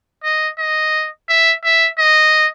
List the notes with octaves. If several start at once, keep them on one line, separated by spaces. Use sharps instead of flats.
D#5
D#5
E5
E5
D#5